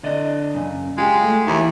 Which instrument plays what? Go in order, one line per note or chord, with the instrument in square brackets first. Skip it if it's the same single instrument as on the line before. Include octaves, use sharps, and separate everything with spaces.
[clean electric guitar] D3 D5 D#5
F#2 C#3
[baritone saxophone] G#3 [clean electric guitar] F4 G4
[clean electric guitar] A3
[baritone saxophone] D#2 [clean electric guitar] E3 E4